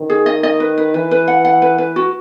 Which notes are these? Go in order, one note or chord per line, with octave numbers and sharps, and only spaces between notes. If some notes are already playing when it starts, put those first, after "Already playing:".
Already playing: D#3
G#4
D#5
D#5
B4
B4
E3 B4
B4
F#5
F#5
B4
B4
F#4